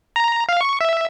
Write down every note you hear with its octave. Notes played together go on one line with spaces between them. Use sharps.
A#5
F5
C#6
E5